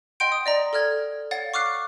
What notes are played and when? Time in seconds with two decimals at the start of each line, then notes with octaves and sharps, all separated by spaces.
0.20 D#5 F#5 G5 C6 G6 D7
0.32 D#6
0.46 D5 D#5 A#5
0.73 A4 D5 F6 G#6
1.31 C#5 F5 F#5 A6
1.54 C#6 D6 F6 F#6 C7